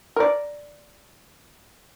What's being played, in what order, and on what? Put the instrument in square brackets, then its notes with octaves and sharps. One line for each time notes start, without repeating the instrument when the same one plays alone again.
[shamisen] A#4 D5